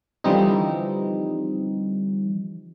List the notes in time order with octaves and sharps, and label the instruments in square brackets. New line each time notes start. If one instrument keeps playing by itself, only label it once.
[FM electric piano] D3 E3 F3 G3 C4 D#4